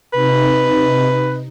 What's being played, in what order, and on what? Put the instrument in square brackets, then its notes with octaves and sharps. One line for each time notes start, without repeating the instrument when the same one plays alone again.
[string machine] C3 D#4 [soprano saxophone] B4